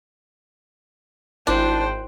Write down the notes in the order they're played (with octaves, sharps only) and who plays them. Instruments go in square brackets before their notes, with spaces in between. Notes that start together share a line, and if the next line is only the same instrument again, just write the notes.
[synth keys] G#1 E4 F#6 [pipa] D4 [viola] C5 G5